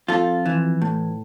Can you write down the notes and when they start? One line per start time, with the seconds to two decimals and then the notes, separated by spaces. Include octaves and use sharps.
0.08 F2 F4 A4
0.46 E3
0.82 A2